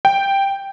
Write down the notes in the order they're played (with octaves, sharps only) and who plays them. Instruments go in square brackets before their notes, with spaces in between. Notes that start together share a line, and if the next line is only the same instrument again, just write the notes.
[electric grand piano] G5